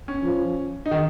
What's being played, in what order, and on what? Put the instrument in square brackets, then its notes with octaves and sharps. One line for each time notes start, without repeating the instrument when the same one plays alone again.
[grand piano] C#4
[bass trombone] F3
[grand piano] D#4
D#3